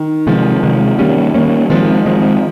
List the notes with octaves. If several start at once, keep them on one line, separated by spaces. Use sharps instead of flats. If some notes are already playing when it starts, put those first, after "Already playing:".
Already playing: D#3
C3 D#3 F3 G#3
C3 D#3 G#3
D#3 G3 A#3 C#4
D#3 A#3 C#4
D#3 F3 G#3 C4
D#3 G#3 C4